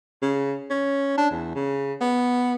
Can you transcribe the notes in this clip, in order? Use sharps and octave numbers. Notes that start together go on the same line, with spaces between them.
C#3
C#4
D4
E2
C#3
B3